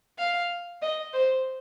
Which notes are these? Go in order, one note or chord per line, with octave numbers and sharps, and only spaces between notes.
F5
D#5
C5